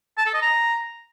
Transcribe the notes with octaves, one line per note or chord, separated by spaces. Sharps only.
A5
A4
D#5
A#5